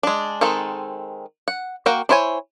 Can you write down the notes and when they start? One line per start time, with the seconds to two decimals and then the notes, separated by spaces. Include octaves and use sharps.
0.03 G#3 D4
0.41 D#3 G#3 C4 A4
1.48 F#5
1.86 A#3 F#4 A#4 G5
2.09 D4 E4 C5 C#5 G#5